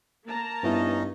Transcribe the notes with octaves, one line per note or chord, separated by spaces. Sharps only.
A#3 A5 A#5
G2 B3 C#4 D#4 E4 D#5